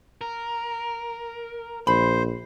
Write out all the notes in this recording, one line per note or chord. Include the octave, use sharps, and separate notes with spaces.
A#4
A#1 C5 B5